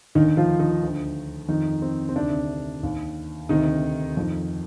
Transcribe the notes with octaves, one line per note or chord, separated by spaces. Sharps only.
D#2 D3 D#3 D#4
F3 F4
D#3 D#4
D2 D3
F2 D#3 D#4
C4
C4
D2 C3 D#3 D4
D#2 D#3
D2 C3 D#3 D#4
F2 D#3